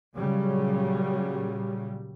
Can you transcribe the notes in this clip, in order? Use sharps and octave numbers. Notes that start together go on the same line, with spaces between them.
A#2 C#3 F#3 G3